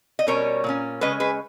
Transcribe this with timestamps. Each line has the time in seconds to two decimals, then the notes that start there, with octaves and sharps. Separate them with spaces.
0.19 D#5
0.27 B2 G3 C#4 A#4 C#5
0.64 A#2 A#3 C#4
1.01 C#3 G#3 C#4 B4 D#5
1.20 G#4 B4